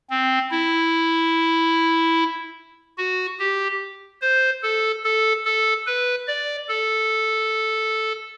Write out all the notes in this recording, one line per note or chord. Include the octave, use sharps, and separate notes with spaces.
C4
E4
F#4
G4
C5
A4
A4
A4
B4
D5
A4